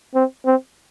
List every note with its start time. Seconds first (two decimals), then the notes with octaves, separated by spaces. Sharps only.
0.15 C4
0.46 C4